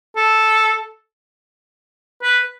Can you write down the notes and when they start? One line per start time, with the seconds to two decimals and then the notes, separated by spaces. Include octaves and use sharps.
0.17 A4
2.23 B4